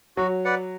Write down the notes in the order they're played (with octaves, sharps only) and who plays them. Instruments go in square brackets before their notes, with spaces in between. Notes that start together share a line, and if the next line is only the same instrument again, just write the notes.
[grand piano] F#3 [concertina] F#4
[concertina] B4 D5 F#5